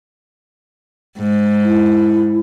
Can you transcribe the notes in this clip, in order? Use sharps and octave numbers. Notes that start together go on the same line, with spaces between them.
G#2
E4